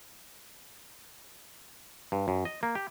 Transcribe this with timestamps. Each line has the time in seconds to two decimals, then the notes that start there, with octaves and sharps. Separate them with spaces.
2.12 G2
2.28 F#2
2.45 D#5
2.63 A#3
2.75 G4